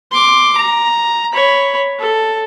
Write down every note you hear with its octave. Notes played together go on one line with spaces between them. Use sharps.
C6 D6
A#5
C#5 B5
A4